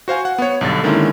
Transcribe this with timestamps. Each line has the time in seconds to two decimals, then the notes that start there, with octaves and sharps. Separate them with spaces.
0.08 F#4 C5 F5 G#5
0.25 F#5
0.38 B3 C#5
0.61 B1 G2 D3 A6
0.83 D3 D#3 G#3 A#3 C#4 E4